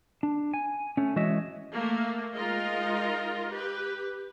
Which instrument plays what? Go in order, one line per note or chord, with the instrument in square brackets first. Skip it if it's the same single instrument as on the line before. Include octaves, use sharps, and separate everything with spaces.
[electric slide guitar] D4
G#5
A3 C#4
E3 G#3 F#4 C#5 D#5 E5
[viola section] A3 A#3
G#3 D#4 F4 A#4 D#5
G4 B4